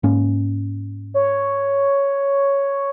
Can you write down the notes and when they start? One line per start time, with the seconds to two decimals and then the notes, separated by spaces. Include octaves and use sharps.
0.03 G#2 A#3 C#4
1.14 C#5